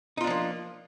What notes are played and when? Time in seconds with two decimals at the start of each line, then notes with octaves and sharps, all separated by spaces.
0.17 D#4
0.21 F4
0.24 D4
0.27 F3
0.30 A#3